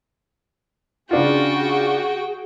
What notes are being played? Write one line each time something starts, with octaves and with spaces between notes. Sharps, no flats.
C#3 D4 F4 F#4 G#4 G5